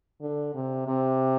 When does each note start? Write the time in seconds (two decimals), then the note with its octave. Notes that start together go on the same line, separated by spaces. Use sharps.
0.21 D3
0.54 C3
0.87 C3